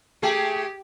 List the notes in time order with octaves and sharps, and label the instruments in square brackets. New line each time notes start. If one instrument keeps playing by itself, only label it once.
[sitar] A3 G#4 [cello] G4 [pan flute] G5